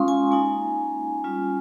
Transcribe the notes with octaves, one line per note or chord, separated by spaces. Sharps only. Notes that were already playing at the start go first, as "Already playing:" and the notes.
Already playing: G#3 C#4 F4 F5 C6 C#6 D#6
G#5
A#3 D#4 G#5
G3 C#4 F4